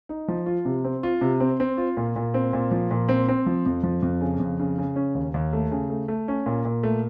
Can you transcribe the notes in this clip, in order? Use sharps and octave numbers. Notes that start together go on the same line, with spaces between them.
D#4
F3
F4
C3
C4
F4
C3
C4
C4
F4
A#2
A#2
C4
A#2
F3
A#2
C4
C4
F3
F2
F3
F2
C#3
F2
C#3
C#3
C#4
D#2
D#2
A3
C#3
A3
A3
C#4
A#2
A#2
A3